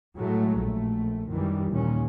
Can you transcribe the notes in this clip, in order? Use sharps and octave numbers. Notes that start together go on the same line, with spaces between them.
A2 F#3 G#3 A3
A#1 A3
F#2 D#3 E3 G3
D#2 A#2 C#4